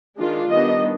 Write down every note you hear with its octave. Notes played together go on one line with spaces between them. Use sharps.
D#3 G#3 D4 F4
D#3 G3 B3 D4 D#5